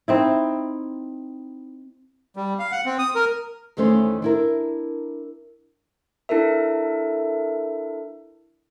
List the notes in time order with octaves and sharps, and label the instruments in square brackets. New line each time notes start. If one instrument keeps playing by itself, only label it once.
[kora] C4 D#4 E4
[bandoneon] G3
F5
F#5
C4
D#6
A#4
[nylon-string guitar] E2 D#3 E3 A3 C#4 C5
D4 E4 A#4
[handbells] D4 E4 A4 A#4 E5